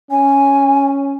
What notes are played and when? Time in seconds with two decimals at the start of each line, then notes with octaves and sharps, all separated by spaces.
0.11 C#4 G#5